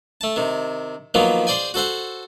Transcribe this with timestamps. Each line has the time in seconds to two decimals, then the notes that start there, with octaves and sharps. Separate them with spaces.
0.21 A3 A5
0.36 C3 D#3
1.14 D#3 F3 F#3 A#3 B3
1.47 G#4 C5 D5 G5 G#5
1.74 F#4 A4 C5 F#5